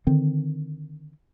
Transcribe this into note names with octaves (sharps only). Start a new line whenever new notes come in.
D3 D#3 C4